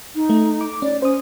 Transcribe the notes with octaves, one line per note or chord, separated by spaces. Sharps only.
D#4
A3
D6
C#4 D5
C#4 C5 D#6